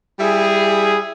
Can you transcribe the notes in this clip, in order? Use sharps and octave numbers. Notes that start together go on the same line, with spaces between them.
G3 E4 G#4